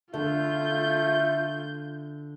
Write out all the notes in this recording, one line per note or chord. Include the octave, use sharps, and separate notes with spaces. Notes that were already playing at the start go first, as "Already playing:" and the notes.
D3 A3 F4 G6